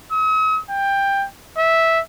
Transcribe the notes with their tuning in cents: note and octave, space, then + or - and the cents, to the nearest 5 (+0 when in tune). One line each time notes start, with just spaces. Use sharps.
D#6 +45
G5 +15
E5 -10